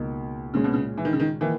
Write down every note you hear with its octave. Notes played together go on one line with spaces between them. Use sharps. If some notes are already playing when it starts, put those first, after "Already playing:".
Already playing: C#2 B2 A#3 D#4
A#2 C#3 G#3 C#4
B2
C#3
E3
D#3
C#3
D#3
D#3 E3 A#3